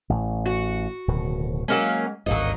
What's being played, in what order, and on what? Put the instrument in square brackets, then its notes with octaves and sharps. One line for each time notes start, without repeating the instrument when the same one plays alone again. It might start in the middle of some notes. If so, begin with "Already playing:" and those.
[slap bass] A1 A2
[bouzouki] F#4
[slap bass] D1 B2 D#3
[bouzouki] F#3 A#3 C#4 [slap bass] G#3
[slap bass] G#1 D2 G2 [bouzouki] F#3 A#3 D#4